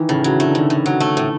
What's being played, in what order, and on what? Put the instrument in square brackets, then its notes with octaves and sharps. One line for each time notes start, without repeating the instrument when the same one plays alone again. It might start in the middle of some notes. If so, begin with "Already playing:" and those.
Already playing: [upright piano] D#3 E3
[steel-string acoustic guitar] A2 [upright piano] C#3
[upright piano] C#3 [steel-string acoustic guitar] F#3
[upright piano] D3 [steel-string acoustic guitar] A3
[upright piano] D#3
[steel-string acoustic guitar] A2 [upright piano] D3
[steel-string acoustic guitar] A2
F#3
A3
A2